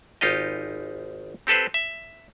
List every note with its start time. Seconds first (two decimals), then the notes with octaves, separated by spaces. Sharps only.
0.21 G#1 D#4 F4 G4 D#5
1.47 C4 G4 A4 B4 C5
1.74 E5